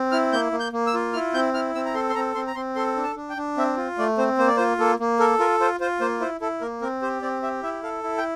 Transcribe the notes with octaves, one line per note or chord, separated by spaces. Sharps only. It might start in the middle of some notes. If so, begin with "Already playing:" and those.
Already playing: C4
E4 F6
A#3 G6
A#3
G6
A#3
E6
F4
E4 F6
C4 G6
E4 F6
C4 E6
A#5
A4 C6
C6
C4 A#5
C4 C6
A#5
C4 C6
A4 C6
D4
A5
D4
G5
D4
C4 E5
F4
A3 D5
C4 C5
A#3 C5
D5
F4 C5
A#3 A4
A#3
A4 A#4
F4 A#4
F4 C5
F4 C5
A#3 C5
E4 C5
E4 A4
A#3 A#4
C4 A#4
G4 C5
C4 D5
G4 E5
E4 E5
A4 F5
E4
G5